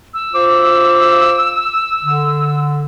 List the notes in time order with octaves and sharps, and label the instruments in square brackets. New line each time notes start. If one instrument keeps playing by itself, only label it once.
[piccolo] E6
[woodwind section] F4 C5 D6
D3